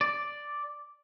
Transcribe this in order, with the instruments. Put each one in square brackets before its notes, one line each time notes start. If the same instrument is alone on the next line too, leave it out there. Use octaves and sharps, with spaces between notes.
[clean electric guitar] D5